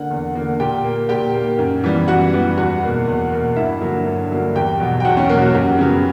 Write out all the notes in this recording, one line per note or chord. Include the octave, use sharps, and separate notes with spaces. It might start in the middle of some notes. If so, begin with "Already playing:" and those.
Already playing: D3 A#3 F#5
E2
D3 A#3
A#2 G4 G5
A#3
A#2 G4 G5
A#3
F#2
E3 G3 B3
F#2 F#4 F#5
E3 G3 B3
E2 F#4 F#5
B2 A#3
E2
B2 A#3
G2 E4 E5
D3 F#3 A#3
G2
D3 F#3 A#3
E2 G4 G5
B2 F#3
G5
E2 F#4 F#5
C#4 C#5
B2 F#3 A#3 A#4
F#4
F#2 G4
C#3 F#3 B3